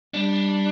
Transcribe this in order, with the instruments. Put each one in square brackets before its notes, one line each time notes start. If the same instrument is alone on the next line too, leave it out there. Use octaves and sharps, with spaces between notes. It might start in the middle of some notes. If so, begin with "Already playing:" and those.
[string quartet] G3 [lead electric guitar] D4